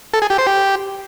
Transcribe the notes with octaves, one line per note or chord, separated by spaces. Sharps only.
A4
G#4
G4
C5
G4